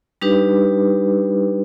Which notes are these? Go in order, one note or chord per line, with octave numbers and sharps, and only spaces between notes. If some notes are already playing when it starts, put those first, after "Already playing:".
G3 D4 D#4 G4 B4